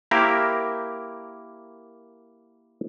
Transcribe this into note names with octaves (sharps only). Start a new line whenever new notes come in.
A#3 E4 G4 A#4 C5